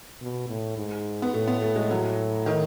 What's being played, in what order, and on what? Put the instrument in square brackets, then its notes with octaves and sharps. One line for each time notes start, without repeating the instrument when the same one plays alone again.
[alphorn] B2
A2
G#2
[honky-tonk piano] B3
[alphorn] A2 [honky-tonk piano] A3
[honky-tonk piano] B3
A3
G#3
F#3
D#3